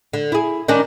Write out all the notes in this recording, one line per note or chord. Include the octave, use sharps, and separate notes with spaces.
D3
E4 G#4
D#3 C#4 D4